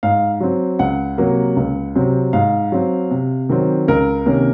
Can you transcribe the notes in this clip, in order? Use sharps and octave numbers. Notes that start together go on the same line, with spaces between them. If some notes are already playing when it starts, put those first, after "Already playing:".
G#2 F5
F#3 C4
C#2 F#5
C3 F#3 A#3
C#2
C3 F#3 C4
G#2 F5
F#3 C4
C3
D#3 F#3 C4
C#2 A#4
C3 D#3 A#3 C#4